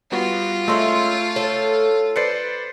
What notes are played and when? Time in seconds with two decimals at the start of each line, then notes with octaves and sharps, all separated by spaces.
0.12 G3 B3 F4 F#4
0.68 G#3 A3 C#4 E4 C6 E6
1.36 A4 C#5
2.16 B4 C5 D5 A6 C7 C#7